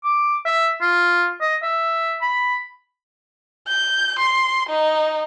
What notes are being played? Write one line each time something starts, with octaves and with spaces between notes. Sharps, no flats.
D6
E5
F4
D#5
E5
B5
G6
C6
D#4